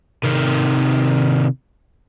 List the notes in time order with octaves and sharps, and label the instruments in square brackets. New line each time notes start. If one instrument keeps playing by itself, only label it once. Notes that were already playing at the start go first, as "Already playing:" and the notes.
[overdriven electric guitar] C3 D#3